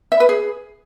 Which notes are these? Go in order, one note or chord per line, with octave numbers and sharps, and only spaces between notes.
E5
B4
G#4